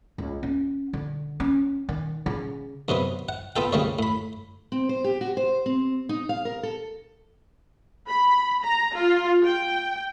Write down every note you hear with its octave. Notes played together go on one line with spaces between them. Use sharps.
C#2
C#4
D3
C#4
D#3
C#3
F#2 C3 F#3 B3
F#5
B3 F4 A4 G5
C#2 C#3 G3 A#3 C#5
A2 B5
C4
C5
G4
F#4
C5
C4
D#4
F5
A#4
A4
B5
A#5
F4
G5